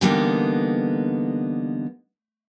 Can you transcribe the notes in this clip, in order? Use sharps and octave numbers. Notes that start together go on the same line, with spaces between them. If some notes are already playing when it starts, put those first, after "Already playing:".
D3 E3 G3 A#3 B3 D#4